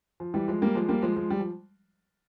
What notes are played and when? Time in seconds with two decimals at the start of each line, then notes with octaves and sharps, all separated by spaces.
0.20 F3
0.34 E3 G3
0.48 F3 G#3
0.62 G3 A#3
0.75 F3 G#3
0.89 G3 A#3
1.02 F3 G#3
1.16 F3 G#3
1.30 G3
1.40 F3